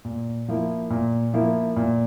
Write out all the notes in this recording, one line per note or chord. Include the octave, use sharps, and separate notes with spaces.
A#2
F3 A#3 E4
A#2
F3 A#3 E4
A#2